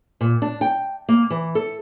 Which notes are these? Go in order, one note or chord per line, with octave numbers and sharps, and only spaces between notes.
A#2
D4
G5
A#3
E3
A4